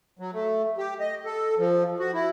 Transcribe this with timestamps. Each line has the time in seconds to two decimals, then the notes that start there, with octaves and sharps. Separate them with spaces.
0.19 F#3
0.32 A3
0.78 G4
1.00 D#5
1.25 A4
1.58 F3
2.00 F#4
2.13 E4